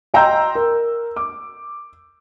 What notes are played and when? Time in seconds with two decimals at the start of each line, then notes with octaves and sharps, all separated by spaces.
0.14 D#5 G5 A#5 C6 E6 G6
0.55 A#4
1.16 D6